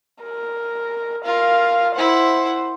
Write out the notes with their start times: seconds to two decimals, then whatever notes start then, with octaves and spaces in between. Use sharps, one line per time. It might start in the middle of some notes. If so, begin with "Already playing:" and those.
0.23 A#4
1.25 F4 A#4 F5
1.96 E4 C5 F#5